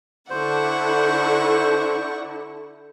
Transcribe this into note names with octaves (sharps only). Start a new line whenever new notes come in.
D3 E4 C5 D5 F#5 C#6